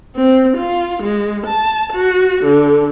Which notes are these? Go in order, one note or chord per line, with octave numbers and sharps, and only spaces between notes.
C4
F4
G#3
A5
F#4
D3